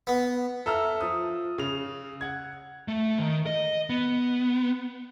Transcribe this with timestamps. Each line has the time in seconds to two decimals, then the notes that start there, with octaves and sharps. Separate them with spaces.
0.07 B3
0.66 A4 E5 A#5 E6 F6
1.01 F3 D#6
1.58 C#3 F7
2.21 F#5 G#6
2.88 A3
3.19 D#3
3.46 D#5
3.90 B3